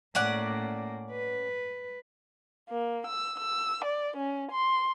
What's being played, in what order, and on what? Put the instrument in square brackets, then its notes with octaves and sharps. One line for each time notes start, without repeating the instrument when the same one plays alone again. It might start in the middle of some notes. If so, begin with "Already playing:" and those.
[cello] A2 A#3 [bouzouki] C#4 D5 F#5
[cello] B4
[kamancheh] A#3
E6
E6
D5
C#4
C6